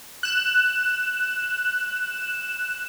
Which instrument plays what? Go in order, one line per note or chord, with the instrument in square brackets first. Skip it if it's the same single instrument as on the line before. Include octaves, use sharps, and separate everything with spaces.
[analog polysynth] F#6 E7